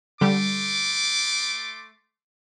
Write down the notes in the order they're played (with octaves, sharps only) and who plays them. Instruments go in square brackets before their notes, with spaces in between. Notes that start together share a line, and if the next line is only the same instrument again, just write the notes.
[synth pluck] D3 G3 [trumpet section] A3 C6 D6